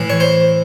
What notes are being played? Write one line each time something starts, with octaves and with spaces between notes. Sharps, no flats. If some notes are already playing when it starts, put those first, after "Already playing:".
Already playing: A2 E3
C#5
C5